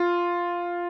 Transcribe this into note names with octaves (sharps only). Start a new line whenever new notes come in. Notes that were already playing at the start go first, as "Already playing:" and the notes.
Already playing: F4